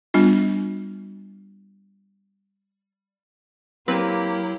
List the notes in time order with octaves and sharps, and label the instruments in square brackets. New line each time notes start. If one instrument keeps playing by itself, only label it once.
[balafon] G3 B3 D4 F4
[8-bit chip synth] F#3 E4 [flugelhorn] A#3 [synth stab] C4 B4 [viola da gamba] G4